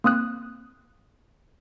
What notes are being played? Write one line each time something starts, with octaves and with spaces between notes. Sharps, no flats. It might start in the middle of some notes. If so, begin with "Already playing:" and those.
A#3 C4 D#6 F#6